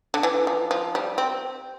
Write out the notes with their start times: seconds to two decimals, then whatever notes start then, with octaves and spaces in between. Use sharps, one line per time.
0.14 D3
0.23 E3
0.47 F3
0.71 F3
0.95 G3
1.18 C4